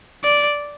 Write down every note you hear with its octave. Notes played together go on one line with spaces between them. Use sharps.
D5